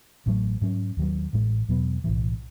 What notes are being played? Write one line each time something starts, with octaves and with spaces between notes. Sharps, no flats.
A1 A2 F#3 A3
G#2 F#3 C#4
D#2 D#3 F#3
A1 A2 G#3
E2 B2 F#3 B3
B1 A2 E3